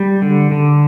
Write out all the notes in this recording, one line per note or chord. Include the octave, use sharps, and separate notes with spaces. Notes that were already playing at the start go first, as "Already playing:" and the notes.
Already playing: G3
D3
D3